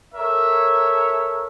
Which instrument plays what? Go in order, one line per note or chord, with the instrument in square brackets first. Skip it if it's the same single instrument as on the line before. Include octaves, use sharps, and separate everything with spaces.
[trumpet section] A4 A#4 C#5 E5